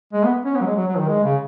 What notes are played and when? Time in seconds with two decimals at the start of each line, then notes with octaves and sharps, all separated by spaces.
0.13 G#3
0.24 B3
0.45 C#4
0.56 B3
0.61 F#3
0.66 G#3
0.77 F#3
0.88 F#3
0.98 D#3
1.08 G#3
1.24 C#3